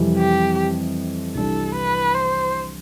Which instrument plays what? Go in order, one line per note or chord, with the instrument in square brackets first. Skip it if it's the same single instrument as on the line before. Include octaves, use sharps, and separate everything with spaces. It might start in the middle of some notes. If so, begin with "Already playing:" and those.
Already playing: [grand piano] F2 C3 E3 G3
[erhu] G4
[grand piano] C2 C3 E3 G3 D4 [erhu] A4
[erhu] B4
C5